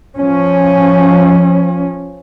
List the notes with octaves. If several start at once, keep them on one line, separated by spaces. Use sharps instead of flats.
F3 C#4